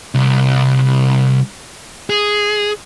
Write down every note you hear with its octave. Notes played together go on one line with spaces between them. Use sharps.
C2
G#4